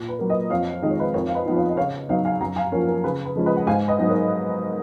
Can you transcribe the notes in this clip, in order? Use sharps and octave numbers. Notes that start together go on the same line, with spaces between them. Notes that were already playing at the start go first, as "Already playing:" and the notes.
Already playing: A#2
B4
F#3 A#3
B4 D#5
F2 C#5 F5
D#3 G#3 D#5
C#5
B4 D#5
F2 A#4 C#5
F5
B4 D#5
F3 B3 D#4
C#5 F5
D#5
C#3 C#5 F5
F#3 B3 D#4 C#5 F5
F5 G#5
F#2 F#5 A#5
F5 G#5
F3 A#3 C#4 A#4 C#5
A#4
C#3 B4
B4
F3 G#3 C#4
B4 D#5
F#5
G#2 F5 G#5
B4 D#5
F#3 B3 D#4
A#4 C#5